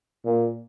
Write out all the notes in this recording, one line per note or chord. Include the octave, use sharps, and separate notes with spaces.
A#2